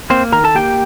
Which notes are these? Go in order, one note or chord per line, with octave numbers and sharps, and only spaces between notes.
A#3 C4 C5
D#3 A#4 A#5
A4 A5
A#3 G4 G5